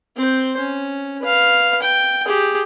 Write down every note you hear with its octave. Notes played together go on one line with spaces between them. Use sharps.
C4 C5
C#4
B4 F5
G5
G4 G#4